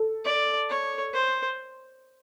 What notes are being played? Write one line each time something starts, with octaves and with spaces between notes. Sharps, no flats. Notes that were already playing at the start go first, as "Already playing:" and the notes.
Already playing: A4
D5
C#5
C5